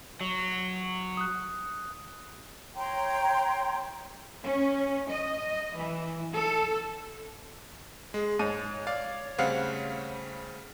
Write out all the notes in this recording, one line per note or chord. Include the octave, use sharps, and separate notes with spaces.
F#3
D#6 F#6
C#5 G5 A#5 C6
C#4
D#5
E3
A4
G#3 G#4
G#2 C#5 D#7
D5 F5
C#3 G3 A3 C4 F5 F#5